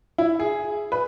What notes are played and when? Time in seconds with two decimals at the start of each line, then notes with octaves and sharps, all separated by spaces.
0.18 E4
0.40 G#4
0.92 B4